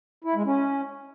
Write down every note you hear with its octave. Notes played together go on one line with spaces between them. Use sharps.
E4
G#3
C#4